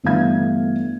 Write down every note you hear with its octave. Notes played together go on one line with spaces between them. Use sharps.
G1 G2 E3 A3 F5 G#6